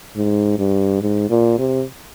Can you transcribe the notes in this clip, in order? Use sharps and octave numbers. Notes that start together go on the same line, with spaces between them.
G#2
G2
G#2
A#2
C3